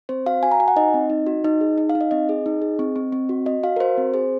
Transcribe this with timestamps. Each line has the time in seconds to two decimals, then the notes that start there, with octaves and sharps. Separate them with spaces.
0.09 C4 C5
0.26 F#4 F5
0.43 F#4 G#5
0.52 A#5
0.60 F#4 G#5
0.68 F#5
0.76 D#4 D#5
0.94 C4
1.10 D#4
1.27 F#4
1.44 D#4 D#5
1.61 G#4
1.78 D#4
1.90 F5
1.95 D#4
2.01 D#5
2.11 C4 D#5
2.29 G#4
2.46 D#4
2.62 G#4
2.79 C4
2.96 C4
3.12 C4
3.29 F#4
3.46 F#4 D#5
3.63 F#4 F5
3.76 A#4
3.80 F#4 C5
3.98 C4
4.14 G#4 C5